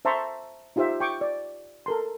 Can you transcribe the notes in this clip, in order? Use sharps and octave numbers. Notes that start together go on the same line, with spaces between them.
C5 E5 A5 A#5 C6 C#6
D#4 F4 G4 C5 E5
G5 C#6 D6
D5
A4 A#4 C6